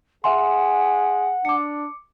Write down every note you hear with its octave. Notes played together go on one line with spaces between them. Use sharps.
G#4 E5 F#5 G#5 C6
D4 D6 C#7